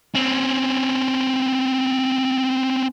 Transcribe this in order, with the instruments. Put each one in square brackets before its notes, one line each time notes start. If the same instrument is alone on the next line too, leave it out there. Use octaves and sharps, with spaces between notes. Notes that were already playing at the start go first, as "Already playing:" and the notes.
[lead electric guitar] C4 C#4